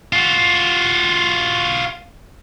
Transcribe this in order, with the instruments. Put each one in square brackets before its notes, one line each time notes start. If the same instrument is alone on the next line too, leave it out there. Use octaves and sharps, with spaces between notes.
[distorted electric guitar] F4 F#4